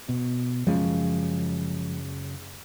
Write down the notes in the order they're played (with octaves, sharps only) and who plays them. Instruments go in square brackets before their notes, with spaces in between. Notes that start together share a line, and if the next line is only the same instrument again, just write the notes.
[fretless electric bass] B2
[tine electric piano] F#2 C#3 [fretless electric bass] F3 G#3